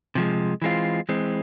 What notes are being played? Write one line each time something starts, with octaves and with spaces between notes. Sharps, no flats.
C3 F3 G#3
E3 G#3 C4 F4
E3 G#3 C4